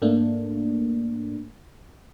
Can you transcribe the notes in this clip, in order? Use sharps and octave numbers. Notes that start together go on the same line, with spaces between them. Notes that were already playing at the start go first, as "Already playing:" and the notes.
G#2 A3 A#3 D4